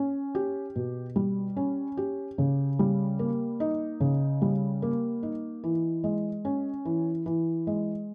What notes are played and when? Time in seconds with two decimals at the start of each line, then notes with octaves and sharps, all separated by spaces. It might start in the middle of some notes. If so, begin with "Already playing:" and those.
Already playing: C#4
0.35 G4
0.75 B2
1.16 G3
1.56 C#4
1.97 G4
2.38 C#3
2.79 G3
3.19 A#3
3.60 D#4
4.00 C#3
4.42 G3
4.82 A#3
5.23 D#4
5.64 E3
6.04 G#3
6.45 C#4
6.85 E3
7.26 E3
7.67 G#3